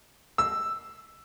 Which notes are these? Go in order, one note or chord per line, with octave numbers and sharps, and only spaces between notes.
E6